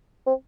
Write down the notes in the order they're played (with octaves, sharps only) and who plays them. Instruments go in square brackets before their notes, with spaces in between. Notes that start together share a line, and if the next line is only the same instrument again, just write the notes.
[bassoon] C4